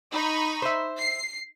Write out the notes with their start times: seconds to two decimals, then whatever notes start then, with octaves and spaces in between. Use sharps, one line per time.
0.12 D#4 B5 C#6
0.62 C5 E5
0.98 C7